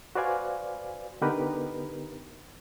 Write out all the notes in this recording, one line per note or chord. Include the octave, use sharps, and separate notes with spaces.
F#4 B4 C5 D5 F5 G#5
D3 B3 D#4 G4 A#4 B4